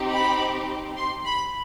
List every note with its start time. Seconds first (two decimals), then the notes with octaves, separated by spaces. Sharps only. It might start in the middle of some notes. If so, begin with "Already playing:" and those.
Already playing: C4 D#4 G4
0.11 B5
0.96 C6
1.25 B5